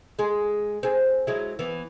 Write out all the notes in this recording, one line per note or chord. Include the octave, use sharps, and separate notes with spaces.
G#3 G#4
C4 G#4
F#3 G#3 E4
E3 B3